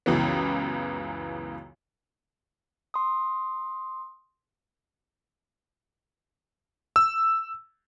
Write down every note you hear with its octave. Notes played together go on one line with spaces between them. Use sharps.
C#2 F#2 C#3 E3 B3
C6 D#6
E6